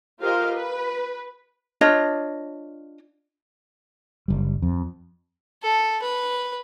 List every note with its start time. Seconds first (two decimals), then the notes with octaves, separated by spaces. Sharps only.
0.20 F4 G4 A#4 C5 D#5 F5
0.53 B4
1.81 D4 F4 C#5 D#5
4.28 F#1 G3
4.62 F2
5.63 A4
6.02 B4